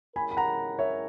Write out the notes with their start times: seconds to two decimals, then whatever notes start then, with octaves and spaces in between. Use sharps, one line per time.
0.15 E3 G#3 C#4 E4 A#4 G#5 B5
0.31 B5
0.37 F#5 A#5
0.79 C#5 E5